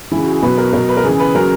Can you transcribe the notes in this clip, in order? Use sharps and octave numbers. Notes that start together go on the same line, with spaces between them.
C#3 E3 E4
F#4
G#4
B2 F#3 B4
A#4
B2 F#3 A#4
B4
A#4
C#3 E3 G#4
B4
C#3 F#3 A#4